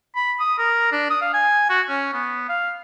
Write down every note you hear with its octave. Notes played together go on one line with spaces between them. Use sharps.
B5
D#6
A#4
D4
D#6
F5
G#5
F#4
C#4
B3
F5